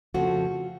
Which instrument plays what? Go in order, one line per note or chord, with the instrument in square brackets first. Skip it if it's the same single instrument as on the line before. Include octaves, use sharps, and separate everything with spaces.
[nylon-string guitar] F2 C#3 F3 A3 C4 F#4